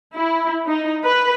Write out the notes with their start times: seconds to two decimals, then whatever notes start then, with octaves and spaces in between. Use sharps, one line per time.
0.14 E4
0.67 D#4
1.04 B4